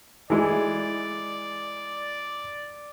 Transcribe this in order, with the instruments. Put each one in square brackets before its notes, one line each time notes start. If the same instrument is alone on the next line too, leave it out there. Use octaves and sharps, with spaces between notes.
[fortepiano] E3 G#3 [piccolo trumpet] D5